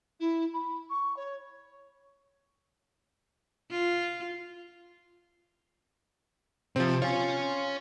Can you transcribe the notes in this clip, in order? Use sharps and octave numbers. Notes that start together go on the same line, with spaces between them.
E4
B5
C#6
C#5
F4
C3 F3 C4 G4
F4 C#5 G#5